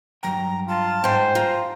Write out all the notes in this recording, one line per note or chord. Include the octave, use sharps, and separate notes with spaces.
G2 F#3 G5 A#5
F4 A5
G#2 C5 G5 G#5
F4 A#5